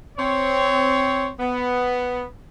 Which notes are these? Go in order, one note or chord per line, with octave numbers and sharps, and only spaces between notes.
C4 C#5
B3